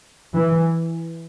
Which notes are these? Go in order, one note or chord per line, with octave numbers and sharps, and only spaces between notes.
E3